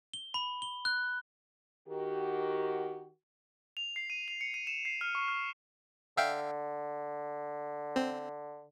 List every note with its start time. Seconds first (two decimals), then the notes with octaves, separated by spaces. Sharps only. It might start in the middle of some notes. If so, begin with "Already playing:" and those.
0.14 G7
0.34 B5
0.62 G7
0.85 F#6
1.88 D#3 F#4 G4
3.77 F7
3.96 C7
4.10 D#7
4.28 F7
4.41 C#7
4.54 D#7
4.67 E7
4.85 C7
5.01 F6
5.15 C#6
5.28 F6
6.17 D3 E5 F5 G5
7.96 C4